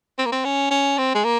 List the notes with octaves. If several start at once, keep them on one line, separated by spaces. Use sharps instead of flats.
C4
A#3
C4
C#4
C#4
C4
G#3
A#3